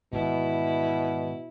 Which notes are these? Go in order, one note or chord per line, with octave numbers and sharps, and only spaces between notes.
G#2 B2 D#3 E3 E4